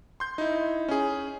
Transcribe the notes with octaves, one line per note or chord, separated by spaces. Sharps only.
C6 G6
D#4 E4
C#4 G#4